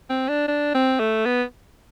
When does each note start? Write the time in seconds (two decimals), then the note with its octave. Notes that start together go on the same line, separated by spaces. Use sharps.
0.10 C4
0.29 D4
0.48 D4
0.74 C4
1.00 A3
1.25 B3